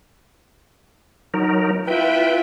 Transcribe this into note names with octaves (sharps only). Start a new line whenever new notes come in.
F#3 D#4 A#4
E4 F4 B4 E5 G5